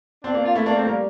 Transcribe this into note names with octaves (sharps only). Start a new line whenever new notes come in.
C4 D4
A#3
F4
A3 E4
A#3 D4
A3 C4
G3 A#3